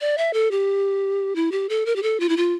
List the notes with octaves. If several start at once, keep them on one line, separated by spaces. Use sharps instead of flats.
D5
E5
A4
G4
E4
G4
A4
A#4
G4
A4
F4
E4
F4